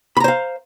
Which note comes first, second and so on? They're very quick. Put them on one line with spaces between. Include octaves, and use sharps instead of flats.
B5 A#5 C5 F5